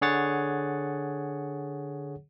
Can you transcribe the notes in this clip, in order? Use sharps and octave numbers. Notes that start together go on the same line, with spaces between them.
D3 G#4 C#5 F#5 A6